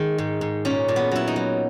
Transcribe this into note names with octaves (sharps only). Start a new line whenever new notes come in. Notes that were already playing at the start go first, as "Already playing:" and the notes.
Already playing: D#3 G#3
G#2
G#2
A#2 C#4
A#2
B3
F#3 E4
D#4
F#3